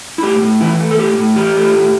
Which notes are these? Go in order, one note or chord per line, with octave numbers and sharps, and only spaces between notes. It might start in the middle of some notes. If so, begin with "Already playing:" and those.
E4
A2 G4
A2
E3 E4
A3
A4
A2 G4
A2
E3 G4
A3
A2